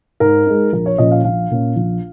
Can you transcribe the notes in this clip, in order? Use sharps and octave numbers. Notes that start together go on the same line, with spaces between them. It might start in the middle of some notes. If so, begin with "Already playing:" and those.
G#2 A#4
G#3 D#4
A#1 A#4
C#5
A#2 F3 C#4 D#5
F5
A#1 F5
A#2 A#3 C#4
A#1